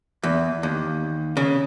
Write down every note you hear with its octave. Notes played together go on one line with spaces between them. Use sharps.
E2
D#2
C#3